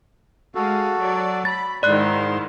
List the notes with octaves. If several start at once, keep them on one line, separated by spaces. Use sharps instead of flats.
G#3 F#4 A4 F5
F#3 D5
B5 A6
G#2 D#3 G#3 E4 D5 C6 F#6